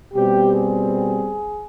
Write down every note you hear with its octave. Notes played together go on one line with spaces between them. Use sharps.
B2 G3 C4 G4
G#4